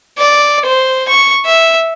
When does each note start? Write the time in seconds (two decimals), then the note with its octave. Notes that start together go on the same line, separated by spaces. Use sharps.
0.18 D5
0.66 C5
1.09 C#6
1.46 E5